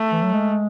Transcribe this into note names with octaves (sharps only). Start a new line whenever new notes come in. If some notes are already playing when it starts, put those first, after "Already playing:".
Already playing: A3
E3
F#3
G#3